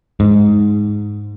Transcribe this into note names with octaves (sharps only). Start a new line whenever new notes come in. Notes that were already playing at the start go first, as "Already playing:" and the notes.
G#2